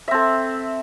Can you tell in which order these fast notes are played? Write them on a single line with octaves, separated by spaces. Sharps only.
E5 C4 A4